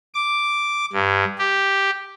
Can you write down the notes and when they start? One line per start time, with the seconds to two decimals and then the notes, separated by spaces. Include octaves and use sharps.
0.14 D6
0.93 G2
1.39 G4